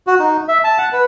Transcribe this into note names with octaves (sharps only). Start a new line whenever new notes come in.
F#4
D#4
E5
A5
F#5
B4